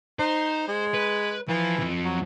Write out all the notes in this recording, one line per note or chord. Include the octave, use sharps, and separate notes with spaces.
D#4 C5
G#3
B4
E3 F3 F4
F2 F3
F#3